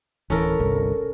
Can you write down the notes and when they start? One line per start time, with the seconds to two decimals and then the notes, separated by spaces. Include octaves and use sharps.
0.30 D1 E3 C#4 A4 A#4
0.60 G1 C2